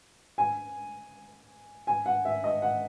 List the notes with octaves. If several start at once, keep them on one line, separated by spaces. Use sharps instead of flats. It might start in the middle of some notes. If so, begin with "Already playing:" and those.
G#5
G#5
F#5
E5
D#5
F#5